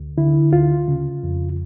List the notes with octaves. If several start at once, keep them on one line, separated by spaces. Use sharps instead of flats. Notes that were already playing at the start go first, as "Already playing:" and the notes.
Already playing: D2
D3 E4
D2 F4
C#3
F2